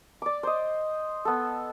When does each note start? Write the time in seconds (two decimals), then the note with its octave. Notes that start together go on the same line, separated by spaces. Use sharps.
0.22 D5 D6
0.43 C5 D#5
1.25 B3 A4